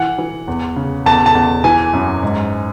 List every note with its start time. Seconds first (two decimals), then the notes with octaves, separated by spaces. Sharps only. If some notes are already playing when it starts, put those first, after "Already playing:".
Already playing: E3 F#5
0.18 E3
0.48 E2
0.76 C#3
1.06 E2 A5
1.26 A5
1.35 E2
1.64 E3 G#5
1.93 F#2
2.23 G#2